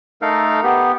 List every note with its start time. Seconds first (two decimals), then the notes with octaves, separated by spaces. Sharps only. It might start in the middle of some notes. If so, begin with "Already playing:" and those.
0.22 A3 D#4 A4 A#4 F5
0.64 B3 G4